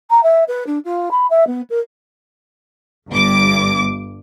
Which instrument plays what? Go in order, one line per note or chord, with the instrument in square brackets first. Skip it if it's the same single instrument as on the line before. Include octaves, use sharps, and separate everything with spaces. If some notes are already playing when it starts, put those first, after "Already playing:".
[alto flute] A#5
E5
B4
D4
F4
B5
E5
B3
A#4
[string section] G1 G2 D6